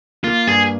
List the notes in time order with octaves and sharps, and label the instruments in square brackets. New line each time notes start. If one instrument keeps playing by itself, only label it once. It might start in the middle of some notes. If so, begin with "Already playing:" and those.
[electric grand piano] A#3 [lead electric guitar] F4
[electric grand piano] G2 [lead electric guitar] G#4